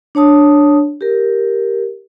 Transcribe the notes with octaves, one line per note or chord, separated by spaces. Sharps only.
D4 C#5 A5 D#6
G4 A#4